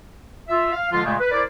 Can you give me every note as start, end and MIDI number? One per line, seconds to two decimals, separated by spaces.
0.48 0.72 65
0.48 0.72 76
0.73 0.89 77
0.91 1.00 50
0.91 1.00 53
0.91 1.00 56
0.91 1.00 65
1.03 1.14 46
1.03 1.14 49
1.03 1.14 56
1.03 1.14 57
1.03 1.14 67
1.03 1.14 68
1.19 1.30 71
1.31 1.42 64
1.31 1.42 70
1.31 1.42 72
1.31 1.42 74